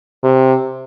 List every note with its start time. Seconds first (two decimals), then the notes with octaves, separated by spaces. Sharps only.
0.24 C3